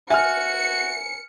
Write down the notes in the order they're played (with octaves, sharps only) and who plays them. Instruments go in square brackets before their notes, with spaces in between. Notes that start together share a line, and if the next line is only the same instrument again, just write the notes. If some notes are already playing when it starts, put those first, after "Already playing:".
[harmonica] F#4 [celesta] E5 [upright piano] G#5 F6 [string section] C#7